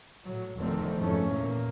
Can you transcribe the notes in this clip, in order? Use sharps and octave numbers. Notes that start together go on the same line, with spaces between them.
A2 F#3
F1 E2 D3 D#3 A3 C4
F2 G#2 E3 A3 C#4
E2 A#2 A#3